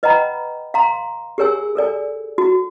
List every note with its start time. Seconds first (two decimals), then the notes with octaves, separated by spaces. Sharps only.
0.03 B4 D#5 F#5 G5 A#5 B5
0.74 F5 A#5 C6
1.38 G4 G#4 A#4 C#5 G#5 E6
1.75 A4 A#4 D5 G#5
2.38 F#4